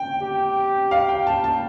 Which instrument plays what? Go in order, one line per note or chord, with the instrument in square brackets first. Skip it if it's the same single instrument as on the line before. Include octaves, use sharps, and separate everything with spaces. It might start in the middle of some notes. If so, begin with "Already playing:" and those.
Already playing: [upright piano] G5
[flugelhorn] G4
[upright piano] F5
G5
A5
A5